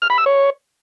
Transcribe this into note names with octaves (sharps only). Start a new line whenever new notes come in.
F6
B5
E6
C#5